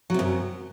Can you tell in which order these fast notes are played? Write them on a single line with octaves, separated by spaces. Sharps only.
F#3 C3 F#2